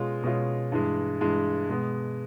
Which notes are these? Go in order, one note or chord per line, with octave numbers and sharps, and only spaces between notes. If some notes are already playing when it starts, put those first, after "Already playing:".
Already playing: B2 G#3 C#4 F4
B2 G#3 C#4 F4
G2 E3 G#3
G2 E3 G#3
B2 G#3 B3